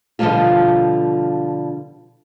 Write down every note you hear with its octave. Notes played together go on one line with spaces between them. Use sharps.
B2 D3 F3 G3 A#3 F4